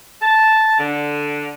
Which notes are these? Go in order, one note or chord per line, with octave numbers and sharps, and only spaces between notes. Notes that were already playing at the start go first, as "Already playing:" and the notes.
A5
D3